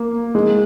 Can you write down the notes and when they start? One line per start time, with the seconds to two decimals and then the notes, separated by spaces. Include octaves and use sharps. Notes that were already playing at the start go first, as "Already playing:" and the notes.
Already playing: A#3
0.35 G#3